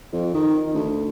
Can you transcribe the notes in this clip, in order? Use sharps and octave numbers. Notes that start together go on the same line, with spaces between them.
F2
D#3
D2